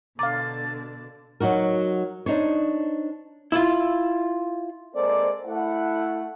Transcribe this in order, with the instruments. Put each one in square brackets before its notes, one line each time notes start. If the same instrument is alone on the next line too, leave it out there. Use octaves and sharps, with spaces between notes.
[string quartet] B2 D3 D4 [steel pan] F5 A#5 [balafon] D6 [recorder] A6
[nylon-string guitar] F#3 D#4 F#4 A#4
D4 D#4 C5 C#5
[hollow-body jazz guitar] E4 F4
[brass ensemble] G#3 A#3 C4 A4 C5 D5
A3 E4 F#5